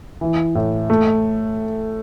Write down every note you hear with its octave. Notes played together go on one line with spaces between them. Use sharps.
E3
A2
A3